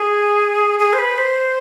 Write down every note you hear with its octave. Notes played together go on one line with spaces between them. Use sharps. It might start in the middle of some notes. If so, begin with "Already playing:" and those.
Already playing: G#4
G#4
C5
B4
C5